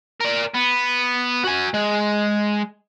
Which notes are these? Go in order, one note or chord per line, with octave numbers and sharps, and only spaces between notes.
A#4 D5
B3
F#4 G#5
G#3